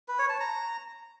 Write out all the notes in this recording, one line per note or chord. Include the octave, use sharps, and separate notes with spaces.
B4
C#5
A5
A#5